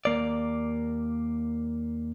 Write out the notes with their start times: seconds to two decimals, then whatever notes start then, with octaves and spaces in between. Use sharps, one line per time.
0.05 D#2 A#3 D5